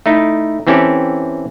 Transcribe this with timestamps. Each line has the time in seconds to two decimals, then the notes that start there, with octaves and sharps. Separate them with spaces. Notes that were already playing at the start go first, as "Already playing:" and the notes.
0.06 A3 D#4 E4
0.67 E3 C4 C#4 G4 A4